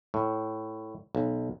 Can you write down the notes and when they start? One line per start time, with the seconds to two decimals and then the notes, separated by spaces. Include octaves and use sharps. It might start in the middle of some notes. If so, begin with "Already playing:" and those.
0.14 A2
1.15 B1